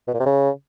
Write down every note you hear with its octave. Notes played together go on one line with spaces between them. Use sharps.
B2
A#2
C3
C#3